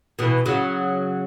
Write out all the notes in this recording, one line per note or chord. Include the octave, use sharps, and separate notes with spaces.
B2 E3
C#3 F#3